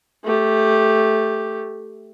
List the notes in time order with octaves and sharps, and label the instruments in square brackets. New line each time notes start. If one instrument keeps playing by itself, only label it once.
[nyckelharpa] A3 G4